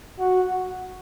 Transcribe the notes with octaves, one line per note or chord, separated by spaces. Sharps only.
F#4